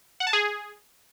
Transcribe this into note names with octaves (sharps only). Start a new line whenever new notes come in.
F#5
A5
G#4